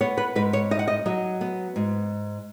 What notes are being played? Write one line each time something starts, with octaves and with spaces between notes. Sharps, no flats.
B3 C#5
B4
G#2 B4
C#5
D#4 D#5
F#5
D#5
F#3 D#5
B3
G#2